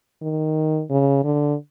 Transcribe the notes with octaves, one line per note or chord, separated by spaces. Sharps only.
D#3
C#3
D3